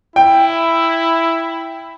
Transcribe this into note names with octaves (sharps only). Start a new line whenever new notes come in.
E4 G5